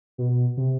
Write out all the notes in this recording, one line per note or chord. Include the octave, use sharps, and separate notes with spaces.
B2
C3